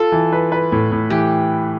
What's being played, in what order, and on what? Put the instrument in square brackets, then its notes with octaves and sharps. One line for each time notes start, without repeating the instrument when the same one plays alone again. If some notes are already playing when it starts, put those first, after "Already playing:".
Already playing: [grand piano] F4 [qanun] A4
[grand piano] E3
B4
B4
A2
A2
[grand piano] E3 [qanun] G4